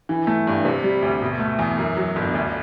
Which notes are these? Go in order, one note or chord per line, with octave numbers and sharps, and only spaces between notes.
E3
A3
G2
C3
G3
D2
B2
A3
E2
F#2
F#3
G1
D2